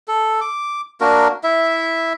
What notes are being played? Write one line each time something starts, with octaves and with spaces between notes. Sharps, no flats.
A4
D6
A#3 D4 F#4 A#4
E4 E5